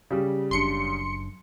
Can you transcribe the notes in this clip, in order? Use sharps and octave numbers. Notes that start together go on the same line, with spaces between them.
C#3 G3
F#1 F#2 D4 C6 C#7